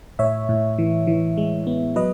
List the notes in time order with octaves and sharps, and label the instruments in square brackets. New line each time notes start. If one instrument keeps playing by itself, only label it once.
[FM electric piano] A2 C#5 E5
A2
E3
E3
G#3
B3
F#3 B4 D#5